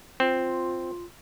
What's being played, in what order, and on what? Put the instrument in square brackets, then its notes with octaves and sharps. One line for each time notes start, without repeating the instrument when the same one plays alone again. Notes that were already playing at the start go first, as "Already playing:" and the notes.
[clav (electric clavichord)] C4 [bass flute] F4